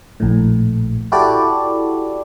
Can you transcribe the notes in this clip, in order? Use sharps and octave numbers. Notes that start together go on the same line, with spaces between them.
A#1 A2
E4 F#4 G4 A4 D5